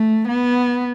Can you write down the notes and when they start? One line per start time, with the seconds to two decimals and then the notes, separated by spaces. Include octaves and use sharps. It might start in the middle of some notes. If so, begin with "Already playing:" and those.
Already playing: A3
0.27 B3